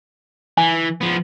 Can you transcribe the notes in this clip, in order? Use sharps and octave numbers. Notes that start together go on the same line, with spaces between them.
E3 G#5
F3 B3